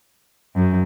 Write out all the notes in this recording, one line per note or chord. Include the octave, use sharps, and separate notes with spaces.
F#2